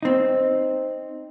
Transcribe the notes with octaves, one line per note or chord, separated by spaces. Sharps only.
C4 D#4